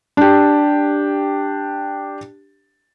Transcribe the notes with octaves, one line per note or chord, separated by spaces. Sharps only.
D4 G4